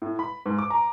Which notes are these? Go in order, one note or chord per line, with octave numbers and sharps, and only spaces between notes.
A2
B5
G#2
D6
A#5